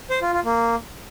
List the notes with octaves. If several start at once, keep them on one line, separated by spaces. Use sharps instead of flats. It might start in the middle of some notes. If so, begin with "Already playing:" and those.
C5
F4
F4
A#3